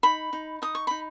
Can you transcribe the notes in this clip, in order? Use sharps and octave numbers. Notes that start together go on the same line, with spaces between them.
D#4 B5
D#4
D#4 D#6
C#6
D#4 B5